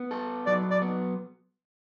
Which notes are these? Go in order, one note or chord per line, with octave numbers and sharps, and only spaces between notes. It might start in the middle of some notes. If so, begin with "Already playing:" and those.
Already playing: B3
A4
F#3 D5
D5
B3